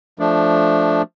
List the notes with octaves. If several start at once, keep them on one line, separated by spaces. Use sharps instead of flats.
F3 A3 D4